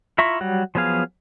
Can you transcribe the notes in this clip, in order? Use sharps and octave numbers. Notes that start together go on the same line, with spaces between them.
E4 F4 E5 A#5 C#6
F#3 G3 F#4
F3 F#3 B3 G#4 F5